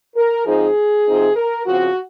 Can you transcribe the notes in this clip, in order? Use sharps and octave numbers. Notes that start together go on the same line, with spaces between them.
A#4
G#2 F3 C4 D#4 G#4
C3 F3 C4 D#4
A#4
C#3 F3 C4 F#4